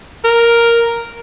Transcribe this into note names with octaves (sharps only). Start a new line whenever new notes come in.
A#4